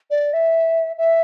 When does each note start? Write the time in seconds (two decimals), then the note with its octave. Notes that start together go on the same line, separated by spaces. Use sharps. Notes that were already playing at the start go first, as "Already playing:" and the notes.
0.11 D5
0.33 E5
0.98 E5